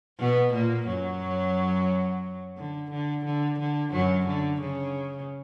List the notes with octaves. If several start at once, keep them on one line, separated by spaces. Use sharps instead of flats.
B2 B3
A#2 A#3
F#2 F#3
D3
D3
D3
D3
F#2 F#3
D3
C#3